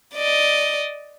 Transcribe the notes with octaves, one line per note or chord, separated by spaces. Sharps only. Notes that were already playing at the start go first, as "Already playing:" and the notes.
D5 D#5